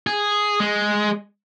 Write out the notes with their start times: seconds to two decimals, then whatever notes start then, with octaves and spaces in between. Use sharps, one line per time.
0.07 G#4
0.60 G#3